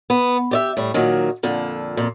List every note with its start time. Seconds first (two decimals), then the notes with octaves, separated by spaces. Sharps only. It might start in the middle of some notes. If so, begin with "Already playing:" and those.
0.10 B3
0.51 G4 D5 E5
0.77 A2 G3
0.94 A#2 D#3 F#3
1.43 F2 A#2 D3
1.97 F2 A#2